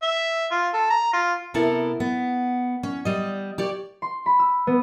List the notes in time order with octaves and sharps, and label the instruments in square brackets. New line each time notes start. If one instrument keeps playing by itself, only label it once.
[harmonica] E5
F4
A4
A#5
F4
[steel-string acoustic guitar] C3 B3 E4 A4 A#4
B3
C#4
G3 D#5
G4 C#5 D5
[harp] C6
B5
E6
B3